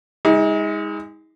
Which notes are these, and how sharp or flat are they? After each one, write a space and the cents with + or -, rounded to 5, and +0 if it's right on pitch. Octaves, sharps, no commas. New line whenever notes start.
G#3 -25 D#4 +40